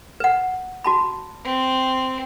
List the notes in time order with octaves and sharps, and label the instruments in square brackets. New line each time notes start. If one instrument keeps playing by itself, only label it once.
[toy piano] B4 F#5
F#4 A5 B5
[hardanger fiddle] C4